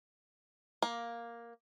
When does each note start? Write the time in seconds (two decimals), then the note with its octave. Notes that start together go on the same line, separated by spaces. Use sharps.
0.82 A#3